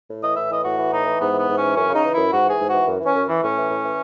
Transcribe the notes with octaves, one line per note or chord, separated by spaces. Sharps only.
A2
E3 D#5
A2 E5
E3 D#5
A2 F#4
E3
A2 D#4
E3
G#2 B3
E3
B3
G#2
E3 C#4
F#2 C#4
C#3 D#4
E3
F#2 E4
G#2 F#4
E3 G#4
G#2
E3 F#4
F#2
E3
C#4
F#2
E3
A2 C#4
E3
A2
E3